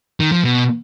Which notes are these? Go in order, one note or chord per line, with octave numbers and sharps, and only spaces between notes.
D#3
F3
B2